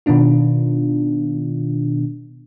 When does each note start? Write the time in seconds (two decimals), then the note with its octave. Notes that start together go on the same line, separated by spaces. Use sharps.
0.06 B2 D#3 B3 D4 F4